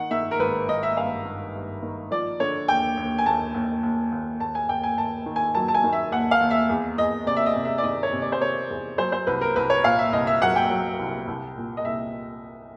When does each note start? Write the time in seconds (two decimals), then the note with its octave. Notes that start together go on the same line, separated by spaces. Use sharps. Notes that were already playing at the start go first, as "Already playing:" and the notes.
Already playing: D#3 F#5
0.11 D#3 E5
0.31 A#4
0.39 G#1 B4
0.68 G#1 D#5
0.83 E5
0.97 G2 F5
1.25 G2
1.55 G2
1.82 D#3
2.11 F3 D5
2.40 D3 C#5
2.68 D#2 G5
2.97 D#2
3.18 G#5
3.26 D#2 A5
3.54 D#2
3.83 D#2
4.12 D#2
4.40 D#2 A5
4.55 G#5
4.69 D#2 G5
4.83 G#5
4.98 D#2 A5
5.26 D#3
5.36 G#5
5.55 F#3 A5
5.68 A5
5.74 G#5
5.84 D#3
5.92 E5
6.12 D#2 F#5
6.31 F5
6.41 D#2
6.51 E5
6.69 E2
6.98 E2 D#5
7.26 C3 D5
7.36 E5
7.46 D#5
7.55 C3
7.65 E5
7.78 D5
7.83 D#3 D#5
8.03 C#5
8.12 C3
8.22 D5
8.32 C5
8.41 C3 C#5
8.70 E2
8.98 F#3 C5
9.12 C5
9.27 C2 B4
9.41 A#4
9.56 C2 B4
9.70 C#5
9.84 A#2 F5
9.99 E5
10.13 C2 D#5
10.27 E5
10.42 F#3 F#5
10.56 G5
10.70 F#3
10.99 C2
11.27 C2
11.56 A#2
11.77 D#5
11.84 C2 E5